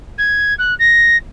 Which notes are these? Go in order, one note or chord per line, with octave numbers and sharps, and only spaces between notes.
G#6
F#6
A#6